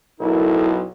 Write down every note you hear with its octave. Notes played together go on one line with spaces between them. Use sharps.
B1 E4 A4 A#4